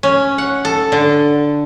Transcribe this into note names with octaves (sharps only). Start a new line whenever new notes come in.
C#4
F#5
A4
D3